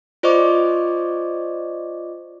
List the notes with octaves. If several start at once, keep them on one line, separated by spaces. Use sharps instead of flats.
F4 C5 D5 D#5 C#6 D6